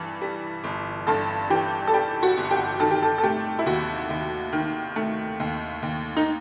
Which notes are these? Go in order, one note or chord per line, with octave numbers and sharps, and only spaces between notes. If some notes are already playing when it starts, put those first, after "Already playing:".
Already playing: G2 E3
G3
G1
G2 A4
E3 G4
A4
G3 G4
F#4
G1
G4
D#3 A4
G4
A4
A4
A3 G4
E4
D#2 F#4
D#2
D#3
A3
D#2
D#2
D#4